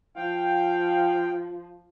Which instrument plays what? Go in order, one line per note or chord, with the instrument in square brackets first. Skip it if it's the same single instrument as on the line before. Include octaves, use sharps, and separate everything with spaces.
[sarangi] F3 [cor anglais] F5 [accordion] G5